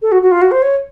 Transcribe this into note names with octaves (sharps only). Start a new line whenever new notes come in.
A4
F#4
F#4
F4
F#4
C5
C#5